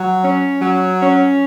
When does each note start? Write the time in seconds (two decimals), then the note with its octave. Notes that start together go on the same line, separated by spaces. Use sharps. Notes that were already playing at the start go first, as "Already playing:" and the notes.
Already playing: F#3
0.23 C#4
0.61 F#3
1.01 C#4